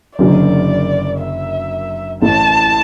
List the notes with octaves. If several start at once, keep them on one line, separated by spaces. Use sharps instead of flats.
F#1 F#2 D3 F#3 D5
E5
A1 A2 A3 A5